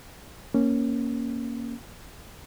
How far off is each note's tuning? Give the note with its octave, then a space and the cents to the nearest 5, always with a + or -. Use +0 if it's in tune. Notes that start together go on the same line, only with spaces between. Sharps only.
A#3 +5 C#4 -5